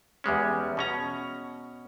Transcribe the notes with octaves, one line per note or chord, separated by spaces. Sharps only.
E2 G3 G#3 C#4
B2 C#4 A#5